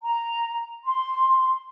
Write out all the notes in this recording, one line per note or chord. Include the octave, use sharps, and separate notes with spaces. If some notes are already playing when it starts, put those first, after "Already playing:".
A#5
C6